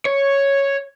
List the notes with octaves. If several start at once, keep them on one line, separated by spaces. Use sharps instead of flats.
C#5